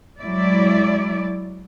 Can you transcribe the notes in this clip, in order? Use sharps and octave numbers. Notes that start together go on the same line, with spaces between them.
F#3 G#3 E4 D5